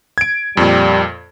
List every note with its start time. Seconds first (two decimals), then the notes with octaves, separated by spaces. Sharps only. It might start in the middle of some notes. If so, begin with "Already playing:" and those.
0.18 G#6 D7
0.57 F2 A#2 G3